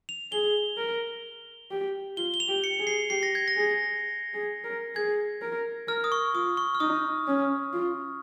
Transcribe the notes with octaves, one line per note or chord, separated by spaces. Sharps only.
F7
G#4 G7
A#4
G4
F4 G7
G7
F7
G4
C#7
G#4
C7
G4 C7
A#6
G#6
A#6
G#4
G#4
A#4
G#4 G#6
A#4
A#4 F6
D#6
C#6
F4 D#6
C#6
F6
D#4 D#6
C#4
F4